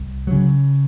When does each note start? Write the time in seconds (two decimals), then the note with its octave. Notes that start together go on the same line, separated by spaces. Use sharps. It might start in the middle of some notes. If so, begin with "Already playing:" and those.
Already playing: C2
0.27 C#3 F#3